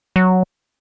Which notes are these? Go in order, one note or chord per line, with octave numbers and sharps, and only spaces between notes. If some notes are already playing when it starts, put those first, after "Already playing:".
F#3